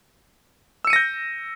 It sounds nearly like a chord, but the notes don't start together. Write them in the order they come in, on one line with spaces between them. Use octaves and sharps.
E6 C#7 D#7 A#6 G6